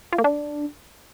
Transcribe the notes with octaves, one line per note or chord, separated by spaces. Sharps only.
F4
A#3
D4